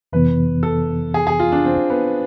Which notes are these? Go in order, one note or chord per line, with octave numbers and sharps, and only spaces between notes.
F2 C3 E3 B3 B4
A4
G#4
G#4
F4
D4
C4
B3